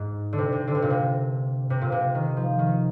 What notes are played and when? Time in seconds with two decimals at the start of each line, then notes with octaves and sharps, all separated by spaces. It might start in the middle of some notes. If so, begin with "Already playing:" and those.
Already playing: G#2
0.33 D3
0.38 C3
0.52 C3
0.67 D3
0.75 C3
0.82 A#2
0.90 C3
1.70 C3
1.81 A#2
1.92 C3
2.15 D#3
2.37 F3
2.59 D#3